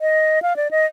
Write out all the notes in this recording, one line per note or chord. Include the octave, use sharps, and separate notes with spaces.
D#5
F5
D5
D#5